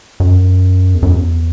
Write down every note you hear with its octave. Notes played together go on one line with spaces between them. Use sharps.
F#2
E2
F#2
E2